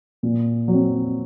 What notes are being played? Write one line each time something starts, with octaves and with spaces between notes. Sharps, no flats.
A#2
F#3
C4